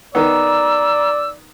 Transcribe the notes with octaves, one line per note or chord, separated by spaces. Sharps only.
D#3 B3 D5 A#5 E6